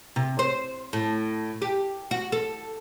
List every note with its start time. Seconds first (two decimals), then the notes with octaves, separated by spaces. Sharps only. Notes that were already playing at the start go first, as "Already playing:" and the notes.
0.16 C3
0.39 C5
0.93 A2
1.62 G4
2.11 F#4
2.32 A4